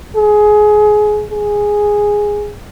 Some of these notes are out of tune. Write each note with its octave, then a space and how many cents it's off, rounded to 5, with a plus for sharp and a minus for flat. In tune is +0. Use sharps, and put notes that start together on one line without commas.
G#4 +20
G#4 -5